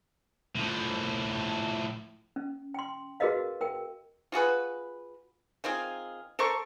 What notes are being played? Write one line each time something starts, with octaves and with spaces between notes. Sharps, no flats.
A2 F3
C#4
G5 C6
F#4 G#4 A#4 B4 D#5 F5
A#4 G5
F4 F#4 G#4 B4
D#3 C4 F4 G#4
A4 A#4 C5 C#6